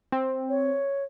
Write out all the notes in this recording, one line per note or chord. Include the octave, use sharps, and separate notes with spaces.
C4
C#5